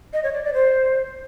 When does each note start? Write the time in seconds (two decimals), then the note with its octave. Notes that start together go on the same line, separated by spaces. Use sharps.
0.13 D#5
0.23 C#5
0.33 D5
0.43 D5
0.54 C5